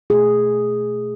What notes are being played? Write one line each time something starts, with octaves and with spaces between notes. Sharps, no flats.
B2 A3 G#4